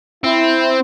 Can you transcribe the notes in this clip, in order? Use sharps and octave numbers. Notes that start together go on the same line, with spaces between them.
C4 E4